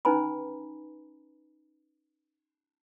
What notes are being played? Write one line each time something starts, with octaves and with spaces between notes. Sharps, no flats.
C#4 D#4 B4 G#5 A#5 B5